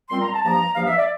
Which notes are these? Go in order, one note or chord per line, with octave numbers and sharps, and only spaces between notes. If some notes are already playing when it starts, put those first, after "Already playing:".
A#2 G3 C4 C6
A#5
A5
G2 F3 A#3 A#5
G2 F3 A#3 F5
E5
D5